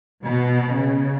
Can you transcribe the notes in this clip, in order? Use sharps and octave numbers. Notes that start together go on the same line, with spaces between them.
B2
C#3